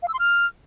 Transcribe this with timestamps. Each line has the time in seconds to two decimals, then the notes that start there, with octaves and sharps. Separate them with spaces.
0.03 F5
0.08 E6
0.14 C6
0.19 F6